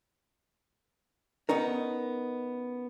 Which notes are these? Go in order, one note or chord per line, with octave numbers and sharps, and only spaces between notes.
B3 C#4 D#4 A#4